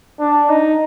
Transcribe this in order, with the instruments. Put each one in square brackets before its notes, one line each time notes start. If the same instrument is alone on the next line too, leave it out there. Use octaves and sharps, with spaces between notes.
[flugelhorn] D4
D#4